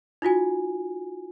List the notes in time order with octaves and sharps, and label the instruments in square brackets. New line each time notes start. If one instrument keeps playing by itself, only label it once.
[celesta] D#4 F4 F#4 G#5